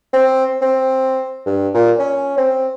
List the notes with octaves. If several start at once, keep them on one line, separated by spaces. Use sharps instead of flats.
C4
C4
G2
A#2
C#4
C4